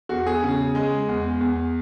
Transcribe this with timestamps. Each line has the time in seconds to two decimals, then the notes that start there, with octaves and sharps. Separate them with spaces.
0.09 E2 F#4
0.27 G#4
0.43 C#3
0.75 G#3
1.08 E2
1.41 E2